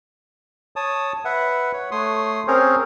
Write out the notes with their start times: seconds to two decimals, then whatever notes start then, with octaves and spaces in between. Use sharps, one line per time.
0.76 C#5 A5 D#6
1.25 B4 E5 F#5
1.73 C#5
1.91 A3 C#5 C6 D#6
2.48 C4 C#4 G#4 A#4 C5 C#5